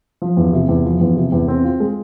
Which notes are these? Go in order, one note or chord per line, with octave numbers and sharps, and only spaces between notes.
F3
E2
C3
E2
F3
E2
C3
E2
C4
F4
G#3